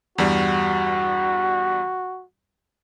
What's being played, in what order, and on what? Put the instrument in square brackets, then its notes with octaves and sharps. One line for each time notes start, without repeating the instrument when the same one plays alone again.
[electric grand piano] E2 G2 G3 [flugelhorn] F#4